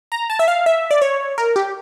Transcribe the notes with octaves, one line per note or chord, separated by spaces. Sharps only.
A#5
A5
E5
F5
E5
D5
C#5
A#4
G4